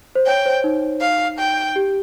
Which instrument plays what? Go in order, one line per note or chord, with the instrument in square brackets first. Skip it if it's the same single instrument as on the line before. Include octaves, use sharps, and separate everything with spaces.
[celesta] C5
[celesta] C#5 [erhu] G5
[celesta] C5
D#4
[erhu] F5
G5
[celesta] G4